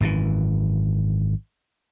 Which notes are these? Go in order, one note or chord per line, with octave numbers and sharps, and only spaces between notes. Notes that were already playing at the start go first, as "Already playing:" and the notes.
G#1 F#2 C#3 E3